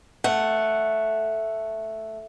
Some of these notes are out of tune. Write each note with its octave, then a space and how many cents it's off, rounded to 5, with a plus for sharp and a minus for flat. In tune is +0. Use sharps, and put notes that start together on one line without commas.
A3 +0 F#5 +0